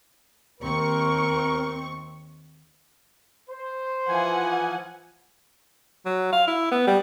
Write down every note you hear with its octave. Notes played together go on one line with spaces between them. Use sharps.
D#2 C4 A#4 C#6
C5
E3 F3 F#5 G#5
F#3
F5
E4
B3
G3